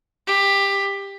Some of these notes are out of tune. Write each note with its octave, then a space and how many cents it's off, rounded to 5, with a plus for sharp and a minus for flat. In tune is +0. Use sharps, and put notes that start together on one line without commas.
G4 +15